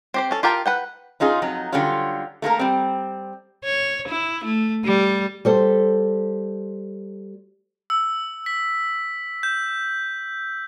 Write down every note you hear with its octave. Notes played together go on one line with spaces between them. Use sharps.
C4 G4 C5
C#4 A4
F4 G4 A#4 G5 A5
B4 F#5 G5
C#4 D#4 F4 G#4
F2 F#3 D#4
D3 F#3 G3 C#4 F4
A3 A#3 F4 A#4
G3 C4
C#5
E4
A3
G3
G3 A4 C5
E6
B6
G6